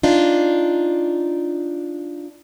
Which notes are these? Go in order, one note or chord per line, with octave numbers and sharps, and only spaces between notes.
D4 D#4 F4